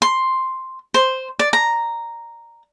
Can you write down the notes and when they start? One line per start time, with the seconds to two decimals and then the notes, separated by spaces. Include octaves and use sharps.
0.02 C6
0.94 C5
1.39 D5
1.53 A#5